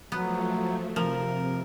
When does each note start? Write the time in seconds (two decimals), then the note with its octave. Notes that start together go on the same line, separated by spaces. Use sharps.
0.12 F3 F#3 A3 B3
0.96 C3 F3 A#4